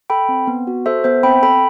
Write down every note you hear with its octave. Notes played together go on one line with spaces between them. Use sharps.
A4 G5 B5
C4
B3
F#4
A4 C5 E5
B3 C5 E5
C4 G5 B5
A4 G5 B5